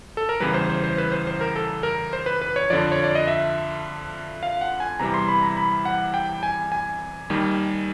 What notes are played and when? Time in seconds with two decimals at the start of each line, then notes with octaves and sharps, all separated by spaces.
0.17 A4
0.29 A#4
0.40 E2 C#3 E3 G3 B4
0.54 C5
0.69 C5
0.84 C5
0.98 B4
1.12 C5
1.27 C5
1.41 A#4
1.56 A4
1.83 A#4
2.13 C5
2.26 B4
2.42 B4
2.56 C#5
2.70 F2 D3 F3 D5
2.92 C#5
3.04 D5
3.15 D#5
3.27 E5
4.43 F5
4.61 F#5
4.80 G#5
5.00 E2 C3 E3 G3 A#5
5.14 C6
5.29 B5
5.43 A#5
5.57 B5
5.85 F#5
6.14 G5
6.43 G#5
6.72 G#5
7.30 D#2 D#3 G3